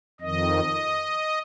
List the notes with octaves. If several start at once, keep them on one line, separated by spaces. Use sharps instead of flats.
F2 D#3 D#5